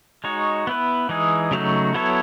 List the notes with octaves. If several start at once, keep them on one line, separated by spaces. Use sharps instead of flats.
G#3 D#4 F#4 C#5
B3 E4 B4
E3 G#3 D#4 G#4
C#3 F#3 A3 D#4 F#4
F#3 B3 E4 A4 C#5